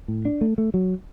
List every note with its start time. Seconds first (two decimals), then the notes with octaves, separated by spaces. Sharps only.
0.08 A2
0.25 D4
0.41 A3
0.58 A3
0.74 F#3